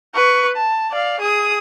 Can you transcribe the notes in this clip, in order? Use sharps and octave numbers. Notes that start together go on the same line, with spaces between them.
B4 C#6
A5
D5 F5
G#4 D#6